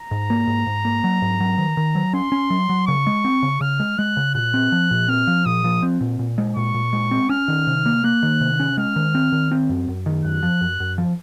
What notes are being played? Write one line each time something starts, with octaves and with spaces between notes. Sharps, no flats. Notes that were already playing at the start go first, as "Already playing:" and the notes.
Already playing: A#5
G#2
A#3
G#2
G#2
A#3
F#3
G#2
F#3
D#3
D#3
F#3
C#4 C6
C#4
F#3
F#3
C#3 C#6
G#3
C4
C#3
C#3 F6
G#3
G#3 F#6
C#3
A#2 F#6
C4
F3
A#2
C4 F6
F3
A#2 D#6
F3
C4
A#2
A#2
G#3
A#2 C#6
A#2
G#3
C4
C#4 F6
D#3
C3
A#3
A#3 F#6
D#3
C3
C#4
G#3 F6
D#3
C4
D#3
C4
F#2
F#2
D#3
F#2 F#6
F3
F#2
F#2
F3